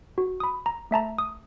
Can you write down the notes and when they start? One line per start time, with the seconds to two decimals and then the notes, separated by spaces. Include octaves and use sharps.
0.18 F#4
0.40 B5 D#6
0.66 A#5
0.91 A3 E5 A5 A#5
1.18 D#6